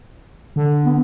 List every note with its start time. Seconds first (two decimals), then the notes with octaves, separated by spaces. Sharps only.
0.56 D3
0.86 B3